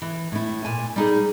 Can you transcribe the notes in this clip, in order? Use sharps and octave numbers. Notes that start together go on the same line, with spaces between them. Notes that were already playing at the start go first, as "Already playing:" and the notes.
E3
A2 E4
A#2 G#5
G3 D#4 G#4